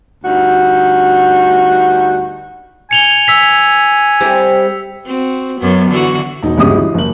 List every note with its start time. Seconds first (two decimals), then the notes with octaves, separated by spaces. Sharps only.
0.24 D2 G2 D#4 F#4
2.91 G#5 C#7 F7 G7
3.27 E6 B6 F7
4.20 G3 C4 E4
5.06 C4 F#4
5.59 F#2 F#3 B3
5.90 D3 E3 F#4
6.43 E1 D#4
6.58 G1 D2 C#3 G#3 G4 D#6
6.76 E3
6.94 F#1 F#7